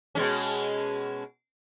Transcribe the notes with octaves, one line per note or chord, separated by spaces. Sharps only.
B2 G#3 C#4